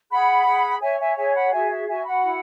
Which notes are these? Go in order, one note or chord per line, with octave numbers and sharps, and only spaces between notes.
G#4 F#5 B5
G#4
C#5 E5 G#5
E5 G#5
G#4 E5 G#5
F#5 B5
F#4 E5 G#5
E5
F#4 E5 G#5
F#5 B5
E4